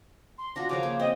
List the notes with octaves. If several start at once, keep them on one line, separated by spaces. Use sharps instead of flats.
C6
D4 F4 F#4 A#6
C#3 F3 A#4 D6
A#3
C4 D#5